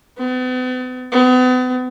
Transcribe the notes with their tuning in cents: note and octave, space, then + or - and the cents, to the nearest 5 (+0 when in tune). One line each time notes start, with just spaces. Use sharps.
B3 +45
B3 +40